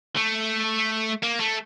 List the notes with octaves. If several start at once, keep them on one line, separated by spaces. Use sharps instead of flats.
A3
A#3
A3